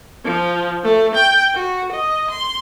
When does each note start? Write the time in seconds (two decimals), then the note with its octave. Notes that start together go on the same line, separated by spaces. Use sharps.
0.25 F3
0.83 A3
1.14 G5
1.55 F#4
1.91 D#5
2.30 C6